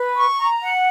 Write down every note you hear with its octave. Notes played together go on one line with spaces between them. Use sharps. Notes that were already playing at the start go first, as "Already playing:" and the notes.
Already playing: B4
C#6
A#5
F#5